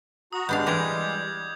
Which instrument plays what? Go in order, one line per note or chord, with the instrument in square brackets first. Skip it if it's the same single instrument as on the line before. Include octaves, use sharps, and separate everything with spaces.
[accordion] F#4 A#5 [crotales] D#6
[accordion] G3 G#3 [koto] B3 D4 F5 [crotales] G6
[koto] E3 G4 A#4 [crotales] D6 G#6